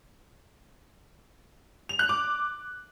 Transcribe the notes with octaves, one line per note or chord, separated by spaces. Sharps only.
F7
F#6
D6